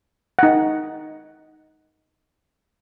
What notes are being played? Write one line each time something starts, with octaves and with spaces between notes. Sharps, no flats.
D#4 F#5